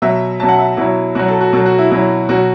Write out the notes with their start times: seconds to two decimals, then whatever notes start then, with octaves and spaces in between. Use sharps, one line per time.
0.02 B2 F#3 E5
0.40 B2 F#3 A5
0.48 F#5
0.59 E5
0.77 B2 F#3 E4
1.15 B2 F#3 F#4
1.28 A4
1.40 F#4
1.53 B2 A4
1.57 F#3
1.66 F#4
1.78 E4
1.91 B2 F#3 E4
2.29 B2 F#3 F#4